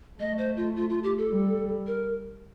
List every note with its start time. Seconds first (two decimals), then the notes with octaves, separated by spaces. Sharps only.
0.20 A3 D#5
0.38 C5
0.57 F4
0.76 F4
0.89 F4
1.03 G4
1.18 A4
1.32 G3
1.87 A#4